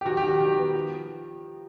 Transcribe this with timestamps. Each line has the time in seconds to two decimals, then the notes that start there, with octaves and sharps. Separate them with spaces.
0.01 G4
0.06 D#3 F#4
0.17 G4
0.23 D#3
0.28 F#4
0.40 D#3
0.57 B3
0.74 F3